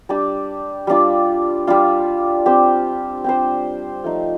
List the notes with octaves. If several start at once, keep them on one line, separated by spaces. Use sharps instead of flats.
G3 D4 G4 D5
G3 D4 F4
G3 D4 F4
C4 G4 C5
C4 G4 C5
F3 A3 D#4